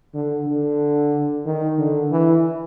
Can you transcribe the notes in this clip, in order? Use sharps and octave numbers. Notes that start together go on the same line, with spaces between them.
D3
D3
D#3
D3
E3